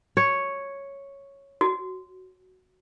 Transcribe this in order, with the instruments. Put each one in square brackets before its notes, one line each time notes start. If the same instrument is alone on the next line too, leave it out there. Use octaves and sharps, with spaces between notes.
[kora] C#5
[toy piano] F#4